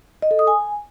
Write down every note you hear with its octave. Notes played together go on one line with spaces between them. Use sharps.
D#5
A4
D#6
G#5